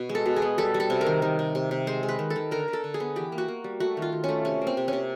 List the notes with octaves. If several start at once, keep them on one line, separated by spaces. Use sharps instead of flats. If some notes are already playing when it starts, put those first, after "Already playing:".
Already playing: B2
G#3
A4
B2
G#4
B3
G3 A4
G3
A4
C3
A#4
D#3
D#3
C3
C3
C3
G#3 C5
G#3
B4
D#3
A4
D#3
D3 A#4
D3
A4
D3
G#4
B3
E3 G4
A#3
F#4
A#3
G3
A3 F#4
D#3
F4
D#3
A3 C#4
C3 C#4
A#3
C4
C3
C3 C#4